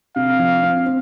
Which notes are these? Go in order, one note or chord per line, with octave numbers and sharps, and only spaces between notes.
C3 F5
F3
C4
C4